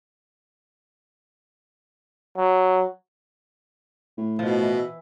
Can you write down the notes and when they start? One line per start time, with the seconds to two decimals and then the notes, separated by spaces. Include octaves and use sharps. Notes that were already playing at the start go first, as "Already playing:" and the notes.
2.38 F#3
4.18 A2
4.39 B2 F3 C5 D#5
4.62 E3
4.78 E6